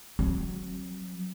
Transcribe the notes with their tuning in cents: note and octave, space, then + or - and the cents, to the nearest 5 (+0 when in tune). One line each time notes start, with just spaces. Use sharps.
F#3 +0 C4 +35